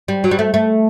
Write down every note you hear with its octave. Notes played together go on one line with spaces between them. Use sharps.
G3
F#3
G3
A3
A3